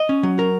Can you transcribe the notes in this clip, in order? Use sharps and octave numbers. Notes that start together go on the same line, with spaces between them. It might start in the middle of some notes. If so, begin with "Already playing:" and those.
Already playing: D#5
C#4
F#3
A#4